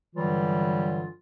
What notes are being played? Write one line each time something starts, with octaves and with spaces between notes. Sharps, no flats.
G2 D3 E3 F#3 G3 F4